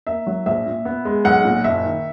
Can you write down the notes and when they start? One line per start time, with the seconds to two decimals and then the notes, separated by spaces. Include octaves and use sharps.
0.07 A#3 E5
0.27 F#3
0.46 A#1 E5
0.66 A#2
0.85 B3
1.05 G#3
1.25 B1 F#5
1.45 A#2
1.64 F#1 E5
1.85 D#3